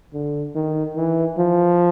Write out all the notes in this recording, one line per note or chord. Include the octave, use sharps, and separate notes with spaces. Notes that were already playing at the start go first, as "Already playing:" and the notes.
D3
D#3
E3
F3